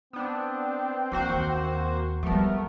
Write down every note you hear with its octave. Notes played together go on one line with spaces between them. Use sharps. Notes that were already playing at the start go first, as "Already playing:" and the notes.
B3 C4 D4
E3 A#3 F#4 C5
D#2
F3 G3 A3 B3 A#4